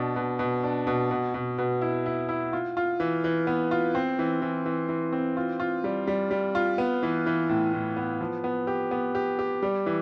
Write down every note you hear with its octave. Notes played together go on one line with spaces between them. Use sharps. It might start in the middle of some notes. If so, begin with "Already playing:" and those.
Already playing: B2 D4
B2
B2
D4
B2
B2
B2
B2
E4
E4
E4
F4
F4
E3
E3
B3
F4
C4
E3
E3
E3
E3
C4
F4
F4
G3
G3
G3
F4
B3
E3
E3
A2
A2
B3
F3
B3
G4
B3
G4
G4
G3
E3